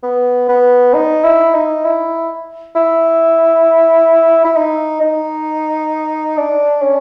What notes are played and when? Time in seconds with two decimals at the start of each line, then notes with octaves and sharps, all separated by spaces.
0.03 B3
0.49 B3
0.94 D#4
1.24 E4
1.54 D#4
1.84 E4
2.75 E4
4.45 E4
4.56 D#4
5.01 D#4
6.37 D4
6.82 C#4